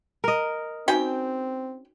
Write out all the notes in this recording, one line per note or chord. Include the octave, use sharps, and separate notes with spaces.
A#4 D#5
C4 C#4 D#4 F#4 G5